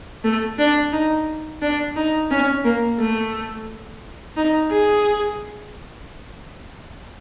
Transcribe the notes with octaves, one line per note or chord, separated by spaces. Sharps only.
A3
D4
D#4
D4
D#4
C#4
A#3
A3
D#4
G#4